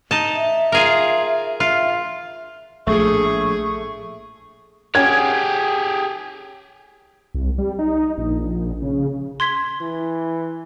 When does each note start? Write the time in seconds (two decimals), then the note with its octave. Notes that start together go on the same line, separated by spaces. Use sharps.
0.11 D#4 A5
0.35 E5
0.72 F4 G#4 A#4
1.60 F4 E5
2.87 A#1 A2 A3 G#4 C#6
4.95 C#4 G4 G#4 F#5 G5 G#6
7.34 C2
7.58 G3
7.79 D#4
8.18 A#1
8.82 C#3
9.40 C6 G#6 B6
9.81 E3